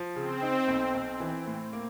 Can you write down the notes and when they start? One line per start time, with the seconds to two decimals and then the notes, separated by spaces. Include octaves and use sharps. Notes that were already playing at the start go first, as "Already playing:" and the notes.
Already playing: F3
0.15 C#3 C4
0.42 D#4
0.68 B1
0.94 B1
1.20 E3
1.47 A2
1.73 A#3